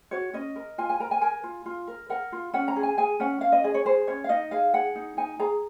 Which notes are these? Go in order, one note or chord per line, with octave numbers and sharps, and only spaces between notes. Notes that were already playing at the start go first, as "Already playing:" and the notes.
F#4 C#5
C#4 D#5
A#4
F4 G#5
G#5
A#4 A#5
G#5
A#4 G#5
F4
F4
A#4
A#4 F#5
F4
C#4 F#5
A#5
G#4
G#5
G#4 G#5
C#4 F#5
C#4 F5
D#5
G#4 D#5
C#5
G#4 C5
C#4 C#5
F5
D#4 D#5
G#4 F5
G#4 F#5
D#4
D#4 G#5
G#4 A#5